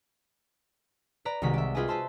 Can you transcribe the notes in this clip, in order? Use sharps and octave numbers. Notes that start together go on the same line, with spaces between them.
B4 D5 A#5
C2 D#3 G#3 F#4 B6
D5 E5
F4 G#4 B4 D5 D#5 G#5
B4 C5 E5 A5 C6